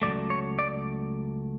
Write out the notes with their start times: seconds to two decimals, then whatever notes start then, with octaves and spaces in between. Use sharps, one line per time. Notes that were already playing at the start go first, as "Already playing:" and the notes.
0.02 C#2 C#3 F#3 A3 D5
0.30 C#5
0.59 D5